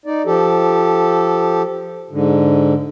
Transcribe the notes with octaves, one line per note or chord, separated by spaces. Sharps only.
D#4 D5
F3 G4 A4
G#2 D3